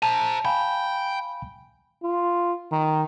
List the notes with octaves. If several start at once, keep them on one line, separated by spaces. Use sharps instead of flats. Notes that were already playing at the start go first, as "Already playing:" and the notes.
C5 A5 A#5
F5 G5 G#5 B5
F4
D#3